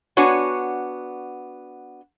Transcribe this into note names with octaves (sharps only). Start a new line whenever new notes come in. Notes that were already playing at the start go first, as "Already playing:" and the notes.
B3 D4 F#4 C#5 G#5